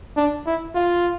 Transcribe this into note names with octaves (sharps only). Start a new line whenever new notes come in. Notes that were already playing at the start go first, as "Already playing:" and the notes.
D4
E4
F4